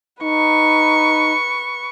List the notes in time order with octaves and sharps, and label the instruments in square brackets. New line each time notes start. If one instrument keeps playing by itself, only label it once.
[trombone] D#4 [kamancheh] B4 C#6